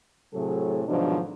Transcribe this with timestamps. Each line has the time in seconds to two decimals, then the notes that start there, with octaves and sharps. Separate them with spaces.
0.34 A2 C3 F#3 G#4 A4
0.87 G#2 B2 D#3 F3 F#3 D4